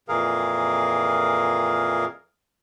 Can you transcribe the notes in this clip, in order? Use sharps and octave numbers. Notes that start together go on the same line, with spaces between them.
F2 A#2 E3 G#4 A#4 F5